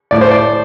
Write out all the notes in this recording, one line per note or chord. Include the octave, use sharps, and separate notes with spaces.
A2 D5
C5
D5